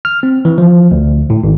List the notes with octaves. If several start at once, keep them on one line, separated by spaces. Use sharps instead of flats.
F6
C4
E3
F3
D2
A2
G#1